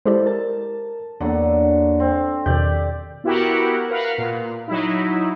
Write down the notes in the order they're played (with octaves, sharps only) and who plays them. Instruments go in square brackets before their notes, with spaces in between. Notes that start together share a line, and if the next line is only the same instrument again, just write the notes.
[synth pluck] G#3 G4 D5 [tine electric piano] E4 A4 C5
[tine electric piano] A#4 [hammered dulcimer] A5
[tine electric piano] E2 A#3 [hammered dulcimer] D3 F#3
[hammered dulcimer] C4
[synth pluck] E2 B2 D#3 [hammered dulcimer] G4 D5 [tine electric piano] G6
[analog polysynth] B3 E4 F#4 G4 A#4 F#5
A#4 B4 F5 F#5
A#2
F#3 D#4 E4